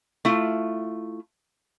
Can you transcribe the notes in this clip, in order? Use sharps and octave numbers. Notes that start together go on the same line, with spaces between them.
A3 E4 F4